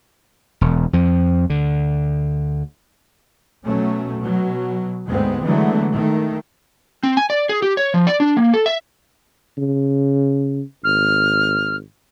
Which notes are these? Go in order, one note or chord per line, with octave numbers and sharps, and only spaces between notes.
E1
F2 F3
D2 D3
B2 F#3 A3 C#4
B2 F#3
D2 G#2 G#3 B3 C4
D3 E3 F#3 G#3 A3 B3
D#3 A3
C4
G#5
D5
G#4
G4
C#5
F3
D5
D4
A#3
A4
E5
C#3
G#1 F6